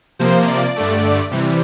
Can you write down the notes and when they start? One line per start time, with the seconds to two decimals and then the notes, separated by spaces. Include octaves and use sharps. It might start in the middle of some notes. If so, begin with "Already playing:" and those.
0.19 C3 F3 A#3 C5
0.48 D5
0.76 G2 D3 A3
1.31 C3 E3 G3